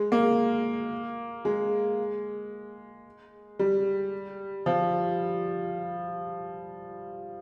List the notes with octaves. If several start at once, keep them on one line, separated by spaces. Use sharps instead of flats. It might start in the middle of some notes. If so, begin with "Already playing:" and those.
Already playing: G#3
A#3
G#3
G3
F3